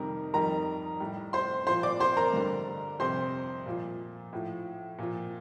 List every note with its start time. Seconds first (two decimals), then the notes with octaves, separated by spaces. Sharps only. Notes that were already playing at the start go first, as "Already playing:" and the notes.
Already playing: F2 C3 D#3 G3 A#4
0.34 F2 D#3 G3 A#4 A#5
1.00 A2 G3
1.33 C5 C6
1.67 F3 C5 C6
1.70 A#2
1.83 D5 D6
2.00 C5 C6
2.17 A#4 A#5
2.33 G2 D3 G3
3.00 F2 C3 G3 C5 C6
3.66 A#2 F3
4.33 A2 F3
4.99 A#2 F3